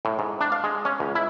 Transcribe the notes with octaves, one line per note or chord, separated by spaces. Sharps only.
A2
G#2
D4
F5
G#3
C#4
C#2
E4